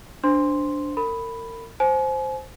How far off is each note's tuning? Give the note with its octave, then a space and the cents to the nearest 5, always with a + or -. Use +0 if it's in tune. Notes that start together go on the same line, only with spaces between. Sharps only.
D4 +0 C5 -15 C6 +0
A#4 -35 B5 +0
C5 +0 G#5 +40